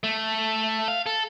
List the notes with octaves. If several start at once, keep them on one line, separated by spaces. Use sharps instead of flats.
A3
F5
A4